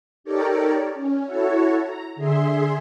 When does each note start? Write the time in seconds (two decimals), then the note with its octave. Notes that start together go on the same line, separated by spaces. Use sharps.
0.24 D#4 G4 A4 A#4 C#5 D5
0.94 C#4
1.26 E4 F#4 A4 C#5
1.83 A#5
2.16 D3 G#4 E5 C6